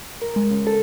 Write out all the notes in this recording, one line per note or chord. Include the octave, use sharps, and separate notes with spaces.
A#4
G#3
C#3
A4